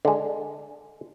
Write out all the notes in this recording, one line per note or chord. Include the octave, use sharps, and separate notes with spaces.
D3 G#3